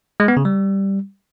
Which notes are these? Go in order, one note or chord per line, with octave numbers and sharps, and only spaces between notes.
G#3
B3
C#3
G3